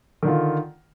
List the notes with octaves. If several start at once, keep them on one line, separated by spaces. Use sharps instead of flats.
D3 D#3 F4